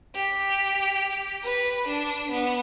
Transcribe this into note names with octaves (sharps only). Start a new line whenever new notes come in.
G4
B4
D4
B3